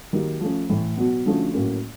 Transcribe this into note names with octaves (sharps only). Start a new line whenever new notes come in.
D#3 F#3 A#3 D#4 G4
F3 A3 C#4
A2 E3 A3
B2 F#3 B3
D3 F3 A3 C#4 F#4
A2 F#3 A#3 C#4